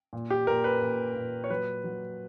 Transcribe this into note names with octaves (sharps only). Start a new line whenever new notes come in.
A#2
G4
A#2 A#4
B4
A#2
A#2
C#5
F#3 B4
F#3